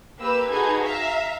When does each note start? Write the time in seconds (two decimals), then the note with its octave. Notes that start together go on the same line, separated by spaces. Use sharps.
0.20 A#3 G4 B4 E6
0.50 D#4 F#4 G#4 A4 B4 G#6
0.84 E5 F5 A#5